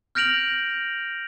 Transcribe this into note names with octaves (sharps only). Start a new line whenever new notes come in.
F6 G6 A#6 D7 F7 F#7